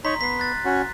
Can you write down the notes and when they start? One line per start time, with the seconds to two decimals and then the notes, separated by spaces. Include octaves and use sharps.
0.05 D#4 C#5 A#5 C6 B6
0.21 B3 B6 C7
0.39 F#6 A6
0.65 C#4 F#4